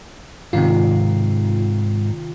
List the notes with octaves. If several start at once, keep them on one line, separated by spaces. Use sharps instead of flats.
G#2 C3 D#3 F4